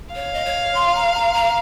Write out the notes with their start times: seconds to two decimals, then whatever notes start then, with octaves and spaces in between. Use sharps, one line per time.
0.15 C#5 F5
0.34 D#5
0.45 C#5
0.75 C6
0.95 A#5
1.14 A#5
1.34 A#5